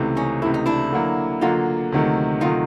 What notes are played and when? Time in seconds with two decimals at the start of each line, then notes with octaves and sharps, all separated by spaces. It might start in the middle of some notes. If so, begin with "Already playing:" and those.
Already playing: C#2 C3 E3 A3
0.17 C#4 D#4
0.42 C#2 C3 E3 A3 E4
0.54 D#4
0.66 D4 E4
0.92 D3 F#3 A#3
1.41 D3 F#3 A#3 D#4 F4
1.92 D2 C3 D#3 F#3 A3
2.41 C3 D#3 F#3 A3 D#4 F4